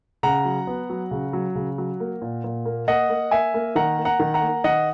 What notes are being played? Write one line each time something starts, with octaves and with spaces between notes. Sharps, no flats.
C#3 F#5 A#5
F#3
B3
F#3
C#3
F#3
C#3
F#3
A#3
A#2
A#2
A#3
A#3 D#5 F#5
A#3
A#3 E5 G#5
A#3
D#3 F#5 A#5
A#3
F#5 A#5
D#3
F#5 A#5
A#3
D#3 D#5 F#5